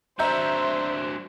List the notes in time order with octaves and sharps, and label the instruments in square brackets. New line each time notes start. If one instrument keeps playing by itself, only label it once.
[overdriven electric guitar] F#3 D4 [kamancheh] C5 [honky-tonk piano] E5 A#5 G6